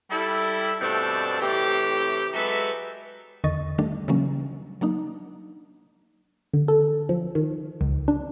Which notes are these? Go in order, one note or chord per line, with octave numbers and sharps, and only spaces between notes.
G3 E4 A4
G2 B2 A3 C4 D5 A5
A2 C3 E3 G4
F#3 G#3 A4 B4 E5
E2 D3 D#3 D#5 C#6 A6
D#3 G3 A3 D4
C#3 E3 F#3 G3 A#3 C#4
F#3 A#3 D4 D#4
D3
A4
F3
D#3
C#2
D4